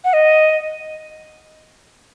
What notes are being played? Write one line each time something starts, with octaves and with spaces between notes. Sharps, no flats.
F#5
D#5